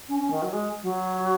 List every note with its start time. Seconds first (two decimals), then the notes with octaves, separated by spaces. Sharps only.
0.08 C#4
0.19 C#4
0.30 D#3
0.42 F#3
0.53 G#3
0.82 F#3